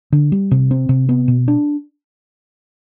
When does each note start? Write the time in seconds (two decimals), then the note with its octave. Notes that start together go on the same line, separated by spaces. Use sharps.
0.12 D3
0.32 G3
0.51 C3
0.71 C4
0.89 C3
1.09 B3
1.28 B2
1.48 D4